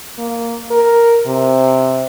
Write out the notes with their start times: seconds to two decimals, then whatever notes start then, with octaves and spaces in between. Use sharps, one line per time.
0.18 A#3
0.71 A#4
1.26 C3